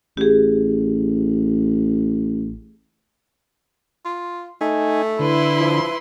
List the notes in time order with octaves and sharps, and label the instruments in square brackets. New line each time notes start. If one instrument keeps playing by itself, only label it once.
[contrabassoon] A1 [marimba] G4 G#4
[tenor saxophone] F4
[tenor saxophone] A3 [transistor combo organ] D#4 G#5
[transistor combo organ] D3 [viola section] E4 [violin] B4 C6
[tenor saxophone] F3